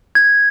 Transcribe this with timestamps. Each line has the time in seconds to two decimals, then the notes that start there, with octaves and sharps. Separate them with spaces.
0.15 G#6